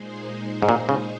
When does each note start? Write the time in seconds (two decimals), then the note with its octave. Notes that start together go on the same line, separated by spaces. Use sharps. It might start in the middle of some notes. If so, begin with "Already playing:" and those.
Already playing: A#2 G#3 D#4 G#4 C5
0.62 G#2
0.69 A#2
0.89 C#3